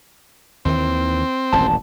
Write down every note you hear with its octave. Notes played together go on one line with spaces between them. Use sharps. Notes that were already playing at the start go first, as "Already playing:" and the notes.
D#2 D#3 E3 C4
D#1 A1 F#2 A5